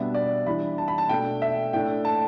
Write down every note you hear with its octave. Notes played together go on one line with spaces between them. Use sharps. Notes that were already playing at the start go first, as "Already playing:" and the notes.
Already playing: B2 G3 B3 D4 E5
D5
E3 G3 D4 B5
A5
B5
A5
B2 A3 D4 G5
E5
A2 A3 D4 G5
A5